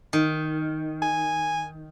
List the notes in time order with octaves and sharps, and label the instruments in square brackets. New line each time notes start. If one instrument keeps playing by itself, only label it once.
[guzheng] D#3
[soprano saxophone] G#5